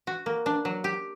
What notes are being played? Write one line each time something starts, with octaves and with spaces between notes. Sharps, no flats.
F#4
A#3
D4
F#3
G4